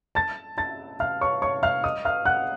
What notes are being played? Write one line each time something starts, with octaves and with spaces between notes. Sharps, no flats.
A5 A6
A5 A6
F5 F6
C#5 C#6
C#5 C#6
F5 F6
D#5 D#6
F5 F6
F#5 F#6